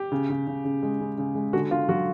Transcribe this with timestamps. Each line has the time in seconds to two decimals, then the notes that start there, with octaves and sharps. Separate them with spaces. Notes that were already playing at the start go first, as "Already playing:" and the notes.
Already playing: G4
0.12 C#3
0.30 C#3
0.47 C#3
0.65 C#3
0.83 G#3
1.01 C#3
1.18 C#3
1.35 G#3
1.53 D3 F#4
1.71 D3 F4
1.89 F#3 F#4